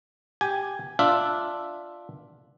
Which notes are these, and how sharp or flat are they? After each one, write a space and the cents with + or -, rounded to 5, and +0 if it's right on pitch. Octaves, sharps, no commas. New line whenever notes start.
G4 +5 G#5 +0
D4 +0 F4 +0 E5 +0